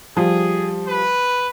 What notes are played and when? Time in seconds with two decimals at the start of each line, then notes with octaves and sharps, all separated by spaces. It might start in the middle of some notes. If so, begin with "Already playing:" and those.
0.17 F3 G3 G#4
0.87 B4